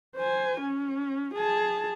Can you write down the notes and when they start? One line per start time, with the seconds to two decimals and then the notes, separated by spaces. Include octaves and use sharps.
0.16 C5 G#5
0.61 C#4
1.34 G#4 A5